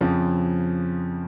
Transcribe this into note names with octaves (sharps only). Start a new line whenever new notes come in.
F2 C#3 F3